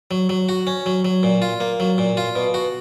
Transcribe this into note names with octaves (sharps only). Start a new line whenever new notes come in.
F#3
F#3
F#4
C#4
F#3
F#3
A#2
F4
A#3
F#3
A#2
F4
B2
F#4